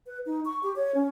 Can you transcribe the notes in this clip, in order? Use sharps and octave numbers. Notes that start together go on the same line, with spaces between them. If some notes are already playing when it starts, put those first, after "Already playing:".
B4
D#4
C#6
G4
C#5
C#4